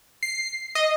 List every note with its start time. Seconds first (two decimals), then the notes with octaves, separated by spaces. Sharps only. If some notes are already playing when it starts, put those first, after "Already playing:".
0.23 C7
0.75 D#5